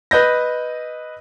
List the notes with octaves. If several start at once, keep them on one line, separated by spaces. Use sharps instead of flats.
B4 D#5 G6 A#6